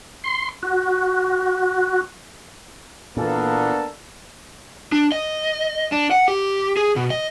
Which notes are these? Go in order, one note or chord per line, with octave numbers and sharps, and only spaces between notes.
C6
F#4
A#2 E3 A#3 B3 D4 A4
D4
D#5
D4
F#5
G4
G#4
B2
D#5